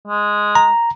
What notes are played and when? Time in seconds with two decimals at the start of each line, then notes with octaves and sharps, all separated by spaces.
0.07 G#3
0.55 A#5